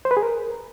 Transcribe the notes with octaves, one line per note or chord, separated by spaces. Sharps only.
C5
B4
G#4
A#4